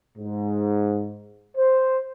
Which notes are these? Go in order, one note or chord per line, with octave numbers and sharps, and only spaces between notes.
G#2
C5